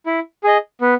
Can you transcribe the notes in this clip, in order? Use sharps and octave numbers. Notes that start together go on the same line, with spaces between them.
E4
G#4 D#5
B3